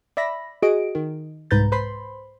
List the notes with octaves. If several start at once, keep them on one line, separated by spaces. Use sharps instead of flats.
D5 E5 B5 A#6
F#4 G#4 D#5 D7
D#3
C2 G#2 B4 A#5 G6 A6
B4 C5 B5 C6